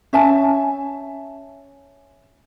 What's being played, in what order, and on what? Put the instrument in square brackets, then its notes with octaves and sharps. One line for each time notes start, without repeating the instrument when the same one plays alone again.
[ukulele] C#4 E5 G#5 A5